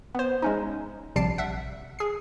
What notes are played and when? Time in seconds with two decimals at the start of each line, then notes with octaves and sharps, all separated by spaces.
0.15 B3 C5
0.42 G#3 C#4 D#4
1.16 A#1 C3 G3 A5 C7 D7
1.38 E5 F#5
1.99 G#4 C7